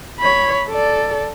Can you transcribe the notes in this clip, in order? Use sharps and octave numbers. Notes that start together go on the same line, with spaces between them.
C#5 B5
A4 D5